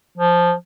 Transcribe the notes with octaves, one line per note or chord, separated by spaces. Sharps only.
F3